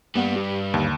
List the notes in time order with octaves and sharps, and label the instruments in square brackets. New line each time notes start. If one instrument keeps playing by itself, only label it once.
[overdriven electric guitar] G2 G3 [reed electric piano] A#3 B3 F#5
[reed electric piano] G4
[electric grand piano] D#2 [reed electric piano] D3